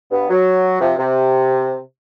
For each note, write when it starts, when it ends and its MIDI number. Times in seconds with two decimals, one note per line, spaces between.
0.11 0.27 43
0.11 0.27 59
0.29 0.80 54
0.81 0.93 48
0.81 0.93 53
0.98 1.78 48